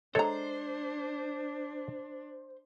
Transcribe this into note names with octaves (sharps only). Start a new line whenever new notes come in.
G#3 D4 A4 C5 C#5 A#5